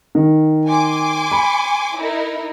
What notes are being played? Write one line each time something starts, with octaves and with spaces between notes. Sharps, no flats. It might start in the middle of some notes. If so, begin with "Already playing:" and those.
D#3
G#5 C6 D6
B5
D#4 E4 A#4